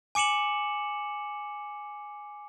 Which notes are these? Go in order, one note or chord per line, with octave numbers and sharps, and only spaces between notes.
G#5 D6 C#7 E7 F#7